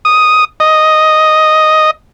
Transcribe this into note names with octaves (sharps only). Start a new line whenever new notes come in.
D#6
D#5